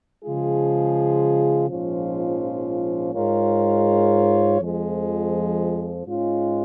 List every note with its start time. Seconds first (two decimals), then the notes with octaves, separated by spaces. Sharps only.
0.24 C#3 F3 G#3 F4 G#4
1.69 A#1 G#2 F3 C#4 F4
3.14 G#2 G#3 F4 A#4 C#5
4.60 F2 F3 G#3
6.06 G#2 G#3 C#4 F4